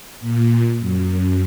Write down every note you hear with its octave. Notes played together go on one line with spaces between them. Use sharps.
A#2
F#2